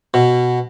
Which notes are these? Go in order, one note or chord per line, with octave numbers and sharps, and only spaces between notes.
B2